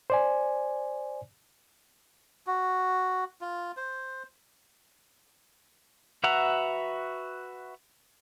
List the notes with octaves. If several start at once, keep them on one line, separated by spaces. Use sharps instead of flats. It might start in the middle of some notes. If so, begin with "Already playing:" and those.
C5 D5 G#5
F#4
F4
C5
F#4 B4 E5 F#5 A#5